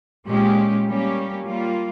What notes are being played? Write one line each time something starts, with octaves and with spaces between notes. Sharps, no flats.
A#2 G#3 C#4 G4
G3 A#3 C#4 G4
G3 A#3 F4